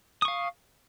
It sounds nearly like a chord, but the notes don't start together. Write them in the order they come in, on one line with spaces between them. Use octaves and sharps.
D#6 C#6 F5